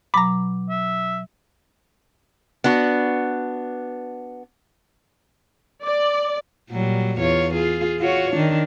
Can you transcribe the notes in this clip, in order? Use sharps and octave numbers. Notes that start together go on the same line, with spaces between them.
B2 F#3 A#5 B5 D6
E5
B3 D4 F#4
D5
A#2 F#3 G3
E2 F4 C#5
F4 G#4
F4 F#4 C#5
D#3 D4